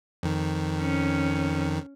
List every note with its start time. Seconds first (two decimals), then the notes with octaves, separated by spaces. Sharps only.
0.23 F2 D#3
0.80 C#4